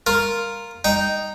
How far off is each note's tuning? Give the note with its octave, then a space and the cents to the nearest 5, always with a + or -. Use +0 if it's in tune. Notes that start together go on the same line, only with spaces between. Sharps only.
F4 +0 A#4 +0
D#4 +0 G5 -10